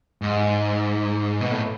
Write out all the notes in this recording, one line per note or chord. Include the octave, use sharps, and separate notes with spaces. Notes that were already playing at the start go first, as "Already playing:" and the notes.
G#2
B2
A2